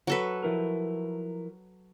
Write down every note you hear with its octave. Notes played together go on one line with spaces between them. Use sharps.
F#3 A4 B4
F3 E4 A#4